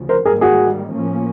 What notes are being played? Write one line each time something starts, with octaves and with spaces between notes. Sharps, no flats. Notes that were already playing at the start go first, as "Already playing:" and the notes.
Already playing: D2 C#3 F3
A#4 C5
G#2 D#3 G3 A#3 G#4 A#4
F#4 G#4
A2 F3 A#3 C#4